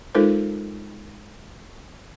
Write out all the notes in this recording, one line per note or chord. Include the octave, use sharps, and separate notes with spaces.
G#3 D#4 F4 A4 A#4 C5